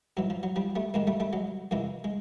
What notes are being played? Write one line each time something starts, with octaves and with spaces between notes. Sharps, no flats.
G#2 E3 F#3
F3
F#3
F3 G3
G3 A3
G#2 D#3 G#3 A#3
G3 A3
G3 A3
F#3 G#3
F2 C3 E3 G#3 A#3
G#3